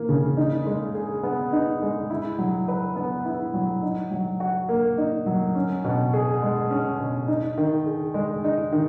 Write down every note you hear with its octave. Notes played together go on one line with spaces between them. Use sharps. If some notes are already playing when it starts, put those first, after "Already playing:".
Already playing: E3 A#3
C#3
D#4
G#3
G#4
B3
D#4
G#3
E4
F#3
B4
B3
E4
F#3
D#4
F#3
F#4
A#3
D#4
F#3
C#4
B2
G#4
G#3
C#4
B2
D#4
D#3
G#4
G#3
D#4
D#3